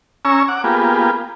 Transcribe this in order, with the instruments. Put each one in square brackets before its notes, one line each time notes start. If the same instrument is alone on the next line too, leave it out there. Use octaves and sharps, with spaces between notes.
[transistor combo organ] C#4 G#5 A#5 C#6 E6
F#5 D6
A#3 B3 F4 G4 G#4